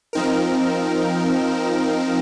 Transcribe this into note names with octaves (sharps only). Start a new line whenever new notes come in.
F3 C4 D#4 A#4